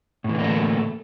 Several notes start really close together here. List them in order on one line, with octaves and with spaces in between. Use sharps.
A2 E3 D3 A#3 A3